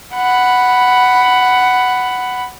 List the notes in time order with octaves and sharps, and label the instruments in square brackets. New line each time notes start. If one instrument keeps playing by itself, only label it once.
[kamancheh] F#5 B5